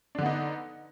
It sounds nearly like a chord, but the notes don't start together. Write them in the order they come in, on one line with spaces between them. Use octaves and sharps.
D4 D3 B3 D#4